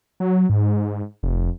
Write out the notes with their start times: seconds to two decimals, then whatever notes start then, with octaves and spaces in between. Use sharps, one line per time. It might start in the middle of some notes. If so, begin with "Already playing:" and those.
0.20 F#3
0.50 G#2
1.23 F1